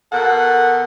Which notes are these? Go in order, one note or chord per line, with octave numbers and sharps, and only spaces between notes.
B2 A4 A#4 F#5